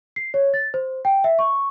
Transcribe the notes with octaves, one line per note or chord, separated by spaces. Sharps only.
C7
C#5
A6
C5
G5
E5
C#6